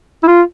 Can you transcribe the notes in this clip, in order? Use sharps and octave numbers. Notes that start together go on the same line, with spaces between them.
E4
F4